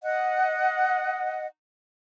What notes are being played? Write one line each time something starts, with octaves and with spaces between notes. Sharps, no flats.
D#5 F#5